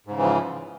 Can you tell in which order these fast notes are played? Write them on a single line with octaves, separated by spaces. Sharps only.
G#2 C#3 E3 F3